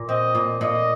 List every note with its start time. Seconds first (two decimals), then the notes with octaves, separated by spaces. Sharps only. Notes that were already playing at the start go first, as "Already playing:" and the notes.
Already playing: A#2
0.09 C4 D#5
0.35 A#2
0.61 A#2 D#5